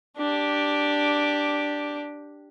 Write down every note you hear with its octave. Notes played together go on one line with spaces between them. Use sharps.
D4 G4